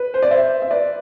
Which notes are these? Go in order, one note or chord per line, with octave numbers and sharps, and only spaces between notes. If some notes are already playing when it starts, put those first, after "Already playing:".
Already playing: B4
C5
D5
C5 E5
E5
B4 D5